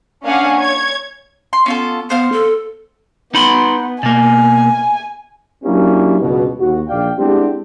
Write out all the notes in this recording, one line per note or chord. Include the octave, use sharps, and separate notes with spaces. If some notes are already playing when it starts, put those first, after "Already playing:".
A#3 C#4 D4 F5 F#5 G#5
C#5 G#6
C6
B3 C#4 F4 A4
B3 C5 F5 F6
A4
B3 D#4 B5 C6
B2 A#3 G#5
F#3 A#3 C#4 D4 E4 G4
C#2 G2 B2
D#2 F#4
A#1 D5 F5 G5
G#3 B3 C4 D4 E4 G4